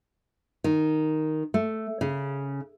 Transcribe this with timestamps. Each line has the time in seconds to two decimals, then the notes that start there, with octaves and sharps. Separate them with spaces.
0.64 D#3
1.54 A3
2.01 C#3